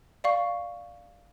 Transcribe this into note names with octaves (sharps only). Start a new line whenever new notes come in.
D5 F5 C#6